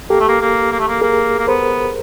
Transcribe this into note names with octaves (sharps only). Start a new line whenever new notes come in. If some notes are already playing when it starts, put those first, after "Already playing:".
A#3 G4 A4
A3
A#3
A#3
A#3
A3
A#3
A#3 G#4 A#4
A#3
B3 A#4 C5